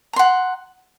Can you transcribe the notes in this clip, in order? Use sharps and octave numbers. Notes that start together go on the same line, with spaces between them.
F#5 A#5 C6